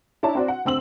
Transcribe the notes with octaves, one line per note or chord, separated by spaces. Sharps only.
D4 E4 C#5 A5 A#5
C4 F#4 D5
F#5
D2 C4 E6 F#7